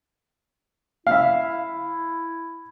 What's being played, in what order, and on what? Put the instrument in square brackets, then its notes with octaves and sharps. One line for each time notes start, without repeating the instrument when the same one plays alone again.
[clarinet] E4 [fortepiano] E5 F5